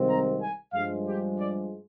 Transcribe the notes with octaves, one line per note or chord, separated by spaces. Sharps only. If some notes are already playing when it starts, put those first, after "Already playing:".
Already playing: C2 C3 D#3 G#3 C4
A#5
G#5
G2 F3 G#3 F5
G4
D5